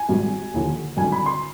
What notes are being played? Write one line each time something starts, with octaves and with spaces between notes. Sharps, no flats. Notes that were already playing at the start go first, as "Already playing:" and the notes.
Already playing: G#5
G#1 G#2 G3
D#2 D3 F3
G#1 G2 D3 G3 G#5
B5
C6